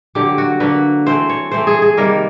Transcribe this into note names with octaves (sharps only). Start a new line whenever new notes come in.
D3 F#3 A#3 G4
F#4
D3 F#3 A#3 B4
E3 A3 C4 C5
C#5
E3 A3 C4 C5
G#4
G#4
C3 D#3 G3 A#3 A#4